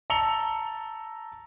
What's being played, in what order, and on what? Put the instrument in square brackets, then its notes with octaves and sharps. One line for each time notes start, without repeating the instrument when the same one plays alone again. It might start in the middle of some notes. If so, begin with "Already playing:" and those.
[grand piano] A5 A#5 E6 C#7 F7 G7